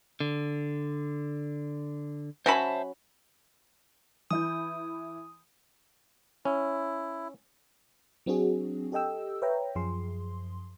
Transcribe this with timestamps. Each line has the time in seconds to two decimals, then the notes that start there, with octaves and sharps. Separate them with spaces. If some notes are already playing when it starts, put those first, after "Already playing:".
0.20 D3
2.46 F#3 C#4 C5 E5 A5 B5
4.31 E3 E4 D#6 G6
6.45 C#4 E4
8.26 F#3 C4 D4 F#4 G#4
8.92 G4 A4 D#5 G5 E6
9.42 B4 C#5 E5 G5 A#5
9.75 F#2 F3 G#4 C6